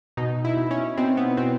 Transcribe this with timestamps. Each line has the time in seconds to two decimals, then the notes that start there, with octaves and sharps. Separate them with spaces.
0.17 B2 D#4
0.45 E4
0.57 B2
0.71 C#4
0.98 B2 C4
1.17 B3
1.37 B2 C4